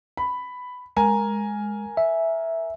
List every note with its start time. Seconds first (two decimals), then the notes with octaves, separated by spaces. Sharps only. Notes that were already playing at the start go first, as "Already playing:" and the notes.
0.17 B5
0.97 G#3 A#4 G#5 A#5
1.97 E5